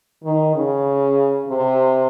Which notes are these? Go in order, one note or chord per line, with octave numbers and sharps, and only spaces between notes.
D#3
C#3
C3